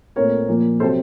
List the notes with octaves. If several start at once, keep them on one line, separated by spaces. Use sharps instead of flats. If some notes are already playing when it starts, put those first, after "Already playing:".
A#2 A3 C4 A#4 C#5
A#2 F3 A#3
C3 F#3 C4 A4 C5